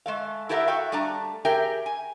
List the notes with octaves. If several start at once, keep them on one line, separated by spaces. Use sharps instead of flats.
G#3 A3 F5
E4 G4 A4 A#4 E5 F#5
F#4 E5 F5 G5
G3 A3 D4 A5 A#5
G4 G#4 A#4 E5 G5
G#5